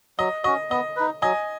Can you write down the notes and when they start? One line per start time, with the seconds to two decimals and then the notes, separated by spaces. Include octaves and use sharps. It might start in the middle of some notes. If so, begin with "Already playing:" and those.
0.19 F#3 D#5
0.44 C#4 F#4 D#5
0.71 B3 D#5
0.96 D#4 B4
1.22 F#3 D#5 G#5